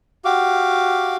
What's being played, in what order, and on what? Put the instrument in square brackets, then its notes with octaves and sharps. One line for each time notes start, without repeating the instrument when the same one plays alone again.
[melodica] F#4 G4 F5 D6